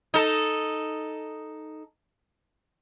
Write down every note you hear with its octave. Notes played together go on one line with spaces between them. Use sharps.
D#4 A4